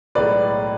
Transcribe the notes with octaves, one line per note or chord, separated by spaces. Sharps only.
B1 A2 G#3 B4 D5